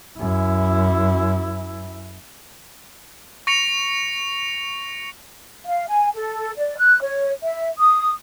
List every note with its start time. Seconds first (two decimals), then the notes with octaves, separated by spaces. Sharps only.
0.19 F#2 E4
3.47 C#6 A#6 C#7 F7
5.65 F5
5.88 G#5
6.15 A4
6.57 D5
6.78 F#6
7.01 C#5
7.43 E5
7.79 D#6